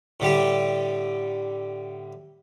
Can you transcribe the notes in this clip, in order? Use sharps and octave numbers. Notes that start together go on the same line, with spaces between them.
A2 D3 G3 G4